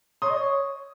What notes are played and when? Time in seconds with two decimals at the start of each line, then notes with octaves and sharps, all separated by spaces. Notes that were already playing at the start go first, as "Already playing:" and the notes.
0.22 C#5 C6 D#6
0.30 D#5
0.37 C#5